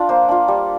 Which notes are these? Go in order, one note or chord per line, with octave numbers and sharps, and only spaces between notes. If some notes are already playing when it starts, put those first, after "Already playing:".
Already playing: D4 F4
A#3 C5
D4 F4
G3